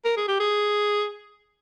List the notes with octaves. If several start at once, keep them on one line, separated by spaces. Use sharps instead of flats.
A#4
G#4
G4
G#4